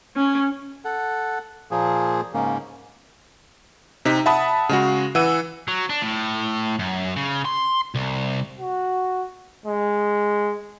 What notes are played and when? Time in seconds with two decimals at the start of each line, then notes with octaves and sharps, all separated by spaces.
0.16 C#4
0.85 A4 F#5
1.71 A#2 F3 A#3 G#4
2.34 G#2 C#3 A#3
4.05 C3 D#4 B6
4.26 E5 F#5 A5 B5 D#6
4.69 C#3 G#3 F#4
5.15 E3 F#5 E6 D#7
5.68 F#3
5.90 D4
6.02 A2
6.79 F#2
7.16 C#3
7.45 C6
7.95 C2
8.59 F#4
9.66 G#3